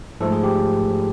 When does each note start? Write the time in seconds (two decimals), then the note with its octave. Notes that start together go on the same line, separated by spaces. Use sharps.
0.20 G#2 F3 A3 A4
0.32 G#4
0.44 G4